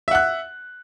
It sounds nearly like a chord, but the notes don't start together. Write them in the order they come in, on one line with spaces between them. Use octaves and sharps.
E5 F#5 F#6